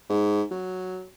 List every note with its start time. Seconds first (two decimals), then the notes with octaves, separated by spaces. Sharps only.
0.10 G#2
0.51 F#3